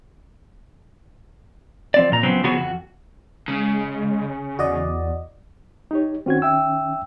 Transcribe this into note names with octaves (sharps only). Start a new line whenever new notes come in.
F3 C4 D5
A#2 A#5
C#3 F3 F#3 B3 C4
C#3 F3 F#3 B3 F#4 G#4
F2 F#4
C#3 G#3
E2 F#4 D5 D#5
D#4 G4 C#5
D#3 C4 C#4 F#4 G#6
E5 G5 E6